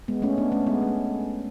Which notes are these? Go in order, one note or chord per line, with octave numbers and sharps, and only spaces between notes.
G#3 B3
A3 C#4
B3 D4
A3 C#4
G#3 B3
A3